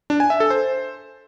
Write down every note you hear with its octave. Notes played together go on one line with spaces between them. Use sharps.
D4
G#5
E5
A4
C5